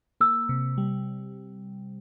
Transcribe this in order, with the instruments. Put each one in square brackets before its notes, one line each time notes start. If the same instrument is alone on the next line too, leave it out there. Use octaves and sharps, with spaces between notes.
[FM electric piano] A#3 [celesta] E6
[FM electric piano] C3
G3